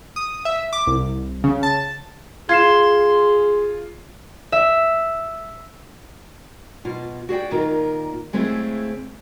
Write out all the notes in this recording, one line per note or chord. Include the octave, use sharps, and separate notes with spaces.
D#6
E5
D6
C2
C#3
A5
F4 G#4 C6 G#6 C7 E7
E5
B2 F4
F#4 G#4 D5 G5
A#2 D#3 F4 A#4
C#3 G#3 A3 C4 E4 G#4